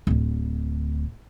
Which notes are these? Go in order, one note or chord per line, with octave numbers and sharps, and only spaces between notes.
D1 D2